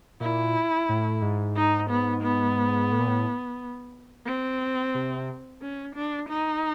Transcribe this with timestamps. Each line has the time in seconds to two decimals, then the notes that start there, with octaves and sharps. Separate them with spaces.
0.20 A#2 E4
0.89 A2
1.22 G#2
1.56 D#4
1.90 B3
2.23 B3
2.92 A2
2.99 A#2
3.08 A2
4.26 C4
4.94 C3
5.61 C#4
5.95 D4
6.29 D#4